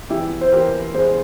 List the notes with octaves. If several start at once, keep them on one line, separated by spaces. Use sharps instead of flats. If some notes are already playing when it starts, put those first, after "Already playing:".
E2 E4 G4
C5
E3 G4 A#4
E2 G#4 C5